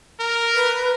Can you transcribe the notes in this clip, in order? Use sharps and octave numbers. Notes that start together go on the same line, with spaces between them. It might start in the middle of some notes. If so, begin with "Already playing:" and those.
A#4
B4